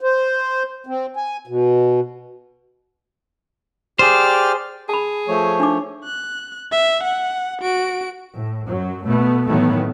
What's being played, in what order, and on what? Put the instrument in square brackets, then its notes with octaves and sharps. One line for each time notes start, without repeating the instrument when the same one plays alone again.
[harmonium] C5
C4
G#5
B2
[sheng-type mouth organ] G4 D5 F6 [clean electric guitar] G#4 C5
[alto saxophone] G#4 [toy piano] A5 B5
[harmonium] F3 A3 C#5
[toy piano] D4 D#4 D6
[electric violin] F#6
E5
F#5
F#4 D7
[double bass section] A2
F#2 F#3
B2 A3 B3
A2 D#3 E3 F#3 A3 B3